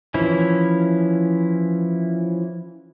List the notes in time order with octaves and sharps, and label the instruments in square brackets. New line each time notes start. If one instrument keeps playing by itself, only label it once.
[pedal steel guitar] E3 F3 C#4 E4